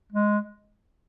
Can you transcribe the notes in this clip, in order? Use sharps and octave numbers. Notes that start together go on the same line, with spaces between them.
G#3